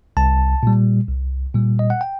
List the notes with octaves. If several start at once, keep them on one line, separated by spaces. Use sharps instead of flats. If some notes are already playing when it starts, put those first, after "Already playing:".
C2 A5
A#2 G3
C2
A#2 G3
D#5
F#5
G5